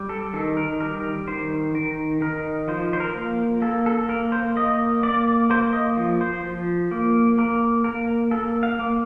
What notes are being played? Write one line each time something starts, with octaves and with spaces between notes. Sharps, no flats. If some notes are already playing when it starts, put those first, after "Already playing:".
Already playing: G3
A4
D#3 A4
A#4
G3 A#4
D#3 C5
D#3 A#4
D#3 A#4
F3 C5
C5
A#4
A#3
A#3 A4
A4
A#3 A#4
C5
A#3 D#5
A#3 D5
A#3 C5
D#5
F3
C5
F3
A#3
A#3 A#4
A#3 A#4
A#3 A4
F5
A#3